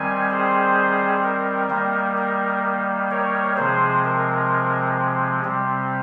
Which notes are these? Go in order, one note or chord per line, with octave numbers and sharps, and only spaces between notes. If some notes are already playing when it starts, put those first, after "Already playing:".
Already playing: D#3 G3 C4 G#5
G#4 C5
A#4
D#3 G3 A#3
A#4
A#4 C#5
C3 F3 G#3 C4 G#4 C5
A#4
C3 G3 C4